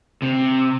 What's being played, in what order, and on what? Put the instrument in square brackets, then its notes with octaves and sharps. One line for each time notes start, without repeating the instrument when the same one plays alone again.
[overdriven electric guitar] C3